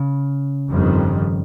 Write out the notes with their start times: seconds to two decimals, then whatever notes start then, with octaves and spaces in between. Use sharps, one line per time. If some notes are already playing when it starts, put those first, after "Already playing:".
Already playing: C#3
0.70 G1 F2 D#3 G3